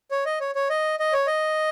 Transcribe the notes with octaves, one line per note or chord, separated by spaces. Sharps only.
C#5
D#5
C#5
C#5
D#5
D#5
C#5
D#5